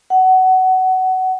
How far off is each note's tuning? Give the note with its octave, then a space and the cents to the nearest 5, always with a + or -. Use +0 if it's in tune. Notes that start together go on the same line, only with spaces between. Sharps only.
F#5 +20